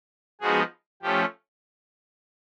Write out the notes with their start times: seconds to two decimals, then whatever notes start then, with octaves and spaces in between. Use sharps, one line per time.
0.41 F3 G#3 B3 D#4 F#4 G#4
1.02 F3 A3 C#4 G4